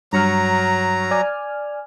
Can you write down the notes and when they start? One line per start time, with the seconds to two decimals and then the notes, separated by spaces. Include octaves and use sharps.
0.13 G2 F#3 A#5 C#6 F6
1.11 D5 G#5 F6